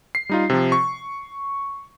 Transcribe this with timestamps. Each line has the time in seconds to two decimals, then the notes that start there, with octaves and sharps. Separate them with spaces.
0.15 C7
0.29 G3 D#4 F4
0.50 C3 F3
0.72 C#6